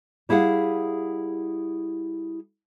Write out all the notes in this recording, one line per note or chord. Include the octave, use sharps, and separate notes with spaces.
G3 E4 G#4 F5 F#5